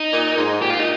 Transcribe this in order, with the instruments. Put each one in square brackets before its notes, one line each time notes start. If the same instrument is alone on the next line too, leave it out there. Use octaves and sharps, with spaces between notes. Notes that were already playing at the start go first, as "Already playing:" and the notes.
Already playing: [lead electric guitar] D#4
[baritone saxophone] A#2
G#2
[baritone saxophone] A#2 [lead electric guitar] G4
[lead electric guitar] F4
D#4